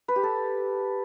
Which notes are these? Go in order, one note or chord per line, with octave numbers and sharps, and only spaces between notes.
B4
G4
A4